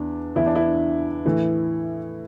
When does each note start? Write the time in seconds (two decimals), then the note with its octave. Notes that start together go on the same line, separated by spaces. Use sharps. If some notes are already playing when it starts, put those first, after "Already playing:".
Already playing: E2 D4
0.36 E2 E3 E4
0.46 D4
0.55 E4
1.25 A2 E3